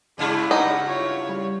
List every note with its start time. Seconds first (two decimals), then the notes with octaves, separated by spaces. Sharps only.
0.18 G2 C#3 G#3 E4 D5
0.51 D#4 F#5
0.83 F4 C#5
1.29 G3